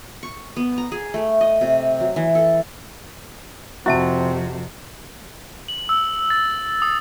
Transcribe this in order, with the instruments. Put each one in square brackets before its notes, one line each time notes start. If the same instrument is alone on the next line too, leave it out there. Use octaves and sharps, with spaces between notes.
[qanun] C#6
B3
A#5
G#4
A3
D#5
C3
F#3
E3
A4
[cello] F2 C3 [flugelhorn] C4 [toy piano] E4 E5 A5 [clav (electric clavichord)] F#4
[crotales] F#7
E6
A6
D#6